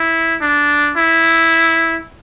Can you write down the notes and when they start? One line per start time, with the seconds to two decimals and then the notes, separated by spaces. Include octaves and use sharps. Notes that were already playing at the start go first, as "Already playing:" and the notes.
Already playing: E4
0.41 D4
0.97 E4